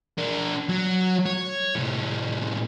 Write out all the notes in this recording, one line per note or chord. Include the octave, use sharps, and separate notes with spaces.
D4 A#4
F#3
C#5
A2 C3